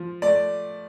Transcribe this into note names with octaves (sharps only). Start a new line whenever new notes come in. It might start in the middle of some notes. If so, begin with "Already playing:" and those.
Already playing: F3
A3 D5